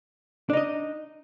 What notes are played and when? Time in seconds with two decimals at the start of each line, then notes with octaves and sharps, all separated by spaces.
0.50 D4
0.53 D#4
0.57 D#5